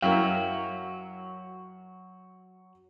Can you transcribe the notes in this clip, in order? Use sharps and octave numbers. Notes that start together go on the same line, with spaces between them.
F#2 F#3 E4 A#4 F5 G5